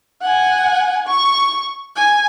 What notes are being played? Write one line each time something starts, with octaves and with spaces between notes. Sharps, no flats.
F#5 G#5
C#6
G#5